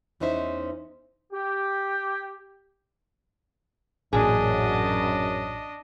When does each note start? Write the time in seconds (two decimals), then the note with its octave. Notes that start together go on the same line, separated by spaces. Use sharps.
0.20 E2 E3 C#4 D#4 C5 E5
1.33 G4
4.13 A1 F#2 A#2 D4 G#4 D#5